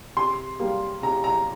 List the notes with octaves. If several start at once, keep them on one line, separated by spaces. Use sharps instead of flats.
C3 C6
G3 A#3
C3 A#5
A#5